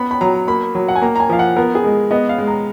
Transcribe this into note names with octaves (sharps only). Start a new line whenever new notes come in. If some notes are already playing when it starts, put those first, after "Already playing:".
Already playing: B3 B5
B5
F#3 A#5
A#3 B5
F#3
F#5
G#5
A#3 A#5
A#5
G#5
F3 F5
F#5
B3 A#4
G#4
G#3
B3 D#5
F5
G#3
A#5